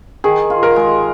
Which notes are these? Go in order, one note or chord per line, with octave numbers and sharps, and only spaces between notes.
D#3 G#4
F4
A#4
G#3